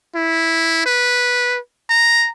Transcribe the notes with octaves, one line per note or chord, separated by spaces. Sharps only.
E4
B4
A#5